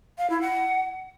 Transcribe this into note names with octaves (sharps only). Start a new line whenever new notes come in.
F5
E4
F#5